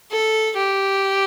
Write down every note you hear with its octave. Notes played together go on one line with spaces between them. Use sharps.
A4
G4